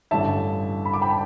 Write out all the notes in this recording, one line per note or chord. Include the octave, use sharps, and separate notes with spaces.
A1 G2 D3 E5 A5
B5
D6
G5 B5
A5